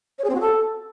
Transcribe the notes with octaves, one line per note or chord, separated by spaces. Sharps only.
C#5
G#4
C4
F#4
A4